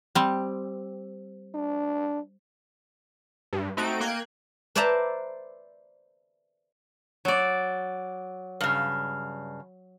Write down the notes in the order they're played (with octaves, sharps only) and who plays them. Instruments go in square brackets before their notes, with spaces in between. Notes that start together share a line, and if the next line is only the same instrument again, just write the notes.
[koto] G3 C4
[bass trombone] D4
[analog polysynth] G2
A3 C4 D#4 F#4 D7
A#3 G5 F#6 G#6
[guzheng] B4 C5 D5 E5 A5 A#5
[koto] F#3 D5
[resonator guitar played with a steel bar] G2 C#3